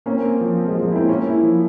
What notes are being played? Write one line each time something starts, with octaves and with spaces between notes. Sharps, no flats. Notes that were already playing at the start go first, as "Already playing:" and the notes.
A#3 C4 C#4
C4
F3
C4
G#3
F3
A#3
C4 E4
A#3 C#4 E4
E4
F3